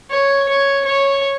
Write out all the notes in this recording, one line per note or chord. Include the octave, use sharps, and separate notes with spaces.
C#5
C#5
C#5